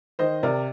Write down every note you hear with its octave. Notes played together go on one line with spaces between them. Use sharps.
D#3 C5 D#5
C3 A#4 D5